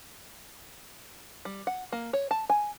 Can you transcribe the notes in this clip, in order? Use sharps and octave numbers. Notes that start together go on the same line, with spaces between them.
G3
F#5
A#3
C#5
A5
G#5